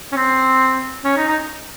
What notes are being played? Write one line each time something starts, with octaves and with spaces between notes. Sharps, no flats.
C#4
C4
C#4
D#4
D#4